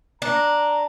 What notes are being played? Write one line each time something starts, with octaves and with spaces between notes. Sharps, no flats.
D4 A#5